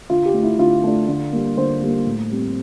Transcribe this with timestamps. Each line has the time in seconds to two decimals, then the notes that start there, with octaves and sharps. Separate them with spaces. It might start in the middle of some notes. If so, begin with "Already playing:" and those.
0.10 D3 F4
0.26 G4
0.34 A3 D4
0.43 E4
0.58 D3 F4
0.84 A3 D4
1.08 D3
1.32 G3 A#3
1.57 D3 C5
1.82 G3 A#3
2.06 A2
2.31 G3 C4